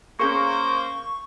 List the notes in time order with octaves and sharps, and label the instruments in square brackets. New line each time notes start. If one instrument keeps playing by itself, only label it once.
[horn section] A#3 C5 [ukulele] C#4 G#4 A#4 [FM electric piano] C#6